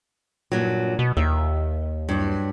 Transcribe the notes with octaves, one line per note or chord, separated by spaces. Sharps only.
G2 A#2 F#3
B2
D#2 E5
G2 F#3